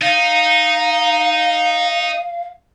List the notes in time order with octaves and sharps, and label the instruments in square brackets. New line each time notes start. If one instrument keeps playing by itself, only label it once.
[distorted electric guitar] D#4 [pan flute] F5